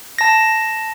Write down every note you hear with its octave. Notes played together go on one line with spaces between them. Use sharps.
A5 A#6